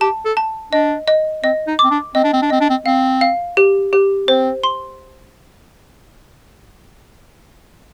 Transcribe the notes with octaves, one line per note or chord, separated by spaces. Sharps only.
G4 A5
A4
A5
D4 D#5
D#5
C4 D#5
D#4
C4 D6
D4
C4 D#5
D4
C4
D4
C4 D#5
D4
C4
C4 F5
F5
G4
G4
C4 C5
C6